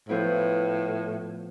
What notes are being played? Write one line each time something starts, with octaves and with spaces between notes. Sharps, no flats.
A2 F3 B3 E4